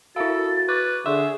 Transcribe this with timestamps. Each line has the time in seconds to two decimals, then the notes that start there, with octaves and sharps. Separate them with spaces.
0.16 E4 F#4 A4 E5 F5 A6
0.69 B4 C#6 D6
1.06 D3 G#4 E5 C6 C#6